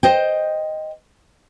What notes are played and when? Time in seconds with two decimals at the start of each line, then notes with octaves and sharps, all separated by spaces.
0.03 C5 D#5 G5